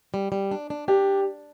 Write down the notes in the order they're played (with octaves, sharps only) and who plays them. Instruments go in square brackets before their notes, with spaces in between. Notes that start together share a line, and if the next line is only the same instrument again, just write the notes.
[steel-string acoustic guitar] G3
G3
D4
D4
[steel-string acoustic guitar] D4 [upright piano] G4